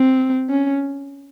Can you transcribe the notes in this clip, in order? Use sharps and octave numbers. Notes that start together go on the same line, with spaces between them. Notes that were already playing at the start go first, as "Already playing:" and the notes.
Already playing: C4
C#4